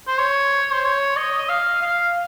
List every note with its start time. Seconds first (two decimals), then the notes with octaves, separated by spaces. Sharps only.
0.07 C5
0.18 C#5
0.72 C5
0.85 C#5
1.16 D#5
1.38 D#5
1.49 F5
1.82 F5